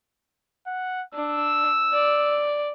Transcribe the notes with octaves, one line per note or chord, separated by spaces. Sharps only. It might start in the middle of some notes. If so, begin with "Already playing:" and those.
F#5
D4 E6
D5